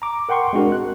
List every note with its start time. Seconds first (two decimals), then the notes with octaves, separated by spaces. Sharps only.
0.02 A#5 D6
0.29 A#4 F#5 G5 C6 C#6
0.53 G#3 C4 D4 F#4 G#4 A#4
0.72 F#6